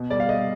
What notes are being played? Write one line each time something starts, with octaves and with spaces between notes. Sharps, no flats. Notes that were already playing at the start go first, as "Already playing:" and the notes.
Already playing: B2
G3 D5
F5
G3 D#5